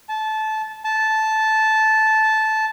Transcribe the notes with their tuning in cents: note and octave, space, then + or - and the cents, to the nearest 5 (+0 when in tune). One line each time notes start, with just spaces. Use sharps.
A5 -20
A5 -10